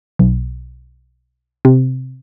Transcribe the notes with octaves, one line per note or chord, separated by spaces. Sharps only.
B1
C3